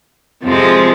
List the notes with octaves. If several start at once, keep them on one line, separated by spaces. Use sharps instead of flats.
F2 C3 F3 G#3